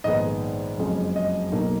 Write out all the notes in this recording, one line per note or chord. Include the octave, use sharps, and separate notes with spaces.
A#1 G#2 D#3 G#3 B3 D#5
F#1 F2 C#3 G#3
D#5
B1 B2 A#3 D#4